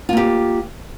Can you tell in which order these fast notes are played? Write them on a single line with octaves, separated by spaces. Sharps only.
F4 A#3 G4